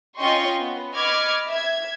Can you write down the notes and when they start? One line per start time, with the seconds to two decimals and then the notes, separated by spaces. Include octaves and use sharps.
0.18 C#4 F4 D#5 G5 C6 C#6
0.60 B3
0.93 D#5 B5 C#6 D6 F6 G#6
1.49 E5 G#6